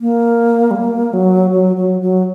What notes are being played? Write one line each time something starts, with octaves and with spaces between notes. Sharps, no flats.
A#3
G3
A#3
F#3
F#3
F#3
F#3